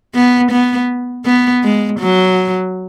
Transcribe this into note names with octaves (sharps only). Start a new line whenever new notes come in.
B3
B3
B3
G#3
F#3